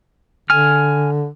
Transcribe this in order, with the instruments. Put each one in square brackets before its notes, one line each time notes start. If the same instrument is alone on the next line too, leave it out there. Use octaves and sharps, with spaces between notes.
[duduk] D3 [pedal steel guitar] G#5 F6